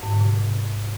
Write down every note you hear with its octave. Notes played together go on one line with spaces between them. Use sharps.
G#2
D3
C3